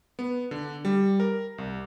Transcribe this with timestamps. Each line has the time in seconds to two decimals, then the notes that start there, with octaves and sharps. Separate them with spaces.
0.19 B3
0.51 D3
0.85 G3
1.20 A#4
1.58 C2